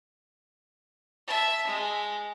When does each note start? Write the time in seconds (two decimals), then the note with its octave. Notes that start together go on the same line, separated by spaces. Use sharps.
1.27 E5 A5
1.67 G#3